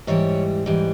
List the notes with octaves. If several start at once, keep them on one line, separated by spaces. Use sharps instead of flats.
G#2 E3 G3 C#5
G#2 E3 G3